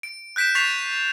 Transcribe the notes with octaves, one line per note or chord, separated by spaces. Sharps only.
D7
F#6 G6 B6 D7 E7
C#6 A6 B6 C7 E7 F7